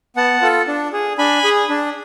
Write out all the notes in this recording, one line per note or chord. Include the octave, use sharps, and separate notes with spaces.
B3 F#5 A5
F4 A4
D4
G#4
D4 G#5 B5
G#4
D4